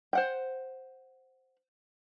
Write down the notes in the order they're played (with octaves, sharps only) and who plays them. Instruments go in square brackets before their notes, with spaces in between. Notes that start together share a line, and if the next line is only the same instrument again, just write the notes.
[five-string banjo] C5 F#5 G5